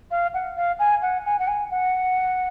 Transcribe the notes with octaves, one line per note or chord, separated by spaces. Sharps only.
F5
F#5
F5
G#5
F#5
G#5
F#5
G#5
F#5